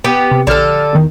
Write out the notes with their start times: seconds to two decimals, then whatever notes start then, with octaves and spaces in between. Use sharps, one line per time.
0.04 B3 G4 G5
0.31 C3
0.47 A#1 D3 A4 F6
0.93 E2 D#3